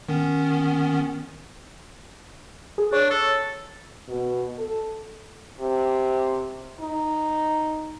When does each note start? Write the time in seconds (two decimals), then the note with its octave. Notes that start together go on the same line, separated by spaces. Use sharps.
0.09 D#3 B3 C#4
2.78 G#4
2.93 D4 C#5
3.10 A4
4.08 B2
4.58 A4
5.60 C3
6.80 D#4